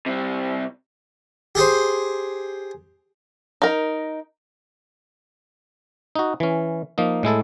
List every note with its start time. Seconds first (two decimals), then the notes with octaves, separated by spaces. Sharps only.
0.06 C3 G3
1.55 G4 G#4 C5
3.62 D#4 A#4
6.16 D#4 F#4
6.40 E3 C#4
6.98 F3 A#3 D#4
7.23 A2 G#3 E4 A4